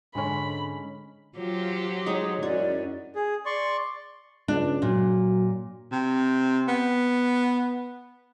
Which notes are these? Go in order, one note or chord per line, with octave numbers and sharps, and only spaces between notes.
G#2 D3 G#3 C#4 B5
F#3 F4 G4 C5
G#3 D#4 C#5 D#6
F#2 C#4 E4 F#4 D5
G#4
D5 C6 C#6
C#2 D4
A#2 F#3
C3
B3